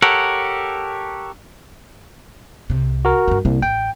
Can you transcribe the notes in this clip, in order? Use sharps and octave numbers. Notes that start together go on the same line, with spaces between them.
G4 A4 A#4 C#5 F#5
C2 C3
F#4 A#4
G2 E4
C2 G3 A#3
A1 G5